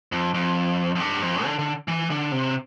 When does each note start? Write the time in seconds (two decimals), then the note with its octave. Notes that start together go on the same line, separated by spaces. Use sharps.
0.12 F2
0.34 F2
0.95 F2
1.00 G2
1.22 F2
1.44 D3
1.59 D3
1.88 E3
2.10 D3
2.32 C3